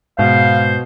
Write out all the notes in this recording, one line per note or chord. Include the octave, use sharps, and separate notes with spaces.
G#2 B2 G#3 B3 C5 F5